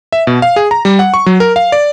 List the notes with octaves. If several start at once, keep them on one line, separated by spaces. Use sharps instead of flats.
E5
B2
F5
G#4
A#5
G3
F#5
C#6
F#3
A#4
F5
D5